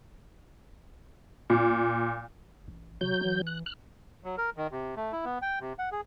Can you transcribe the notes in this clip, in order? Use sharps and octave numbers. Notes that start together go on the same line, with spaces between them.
A#2
A1
C3 F#3 G6
E3
F#6
F6 F#6
F#3
A#4
D#3
C3
A3
E4
B3
G5
C3
F#5
G#4